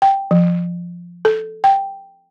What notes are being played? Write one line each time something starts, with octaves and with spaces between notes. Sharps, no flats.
G5
F3
A4
G5